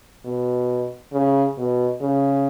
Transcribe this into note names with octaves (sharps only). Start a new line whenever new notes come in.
B2
C#3
B2
C#3